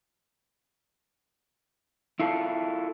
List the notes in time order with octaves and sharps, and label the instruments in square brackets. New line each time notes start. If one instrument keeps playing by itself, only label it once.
[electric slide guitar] E4 F4 A4